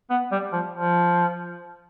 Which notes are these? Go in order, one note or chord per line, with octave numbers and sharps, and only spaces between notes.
B3
G3
F3
F3